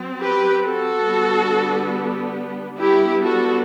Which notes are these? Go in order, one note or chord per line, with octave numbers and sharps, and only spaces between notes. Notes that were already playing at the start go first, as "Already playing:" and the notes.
Already playing: F#3 C4
G4 B4
F#4 A4
D3 G3 B3 D4
G3 B3 D4 E4 G4
F#4 A4